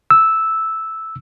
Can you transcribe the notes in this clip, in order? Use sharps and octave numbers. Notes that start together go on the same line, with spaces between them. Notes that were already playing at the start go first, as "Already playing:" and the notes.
E6